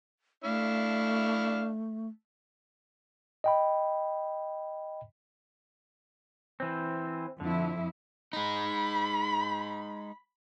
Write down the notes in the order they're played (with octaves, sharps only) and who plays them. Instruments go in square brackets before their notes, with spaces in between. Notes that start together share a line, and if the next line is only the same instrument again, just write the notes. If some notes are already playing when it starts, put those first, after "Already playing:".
[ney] A3 [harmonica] D4 E4 F5
[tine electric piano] D#5 G5 B5
[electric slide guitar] E3 C4
[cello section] F2 F3 E4 [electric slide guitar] D3
[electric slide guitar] G#3 D#4 [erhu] B5